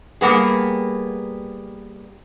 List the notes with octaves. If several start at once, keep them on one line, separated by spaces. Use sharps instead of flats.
G3 A#3 B3 G#4